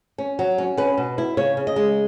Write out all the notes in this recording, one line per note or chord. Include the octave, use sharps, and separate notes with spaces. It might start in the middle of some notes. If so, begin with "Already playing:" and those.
C#4
F#3
C#4
C#4 B4
B2
E4
C#3 C#5
C#3
D#5
G#3